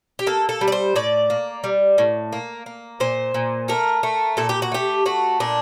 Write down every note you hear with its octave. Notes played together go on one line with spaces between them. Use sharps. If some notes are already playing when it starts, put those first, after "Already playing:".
G4
A#3 A4
A4
G3
D5
C5
A2 D5
A#3
G3
A2
A#3
A#3
A#2 C5
A#2
A3 A#4
A3
A#2 A4
G4
F#4
A3 G4
A3 F#4
A#2 D4